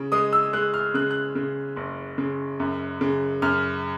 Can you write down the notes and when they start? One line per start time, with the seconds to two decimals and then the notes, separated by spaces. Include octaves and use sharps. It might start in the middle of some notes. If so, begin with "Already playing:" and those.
Already playing: C#3
0.12 G#3 D#6
0.33 E6
0.53 G#3 F#6
0.74 F6
0.94 C#3 F#6
1.11 F#6
1.35 C#3
1.76 F#1
2.18 C#3
2.60 F#2
3.01 C#3
3.42 F#2 F6